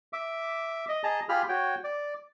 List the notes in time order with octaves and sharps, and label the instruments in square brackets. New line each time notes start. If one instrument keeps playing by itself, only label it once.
[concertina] E5 D6
D#5
G#4 D#5 A5 A#5
F4 G4 G#4 B5 F6
F#4 C#5 G5
D5